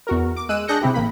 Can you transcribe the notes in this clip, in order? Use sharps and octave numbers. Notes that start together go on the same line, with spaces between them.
E2 F#4 A#4
D6
G#3 E6 F#6 D#7
D4 G#4 F#6 G6 A#6 C#7
C3 C4 E4 G4
A1 A#3 B5